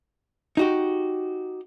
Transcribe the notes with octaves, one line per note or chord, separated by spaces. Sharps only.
D#4 F#4 G4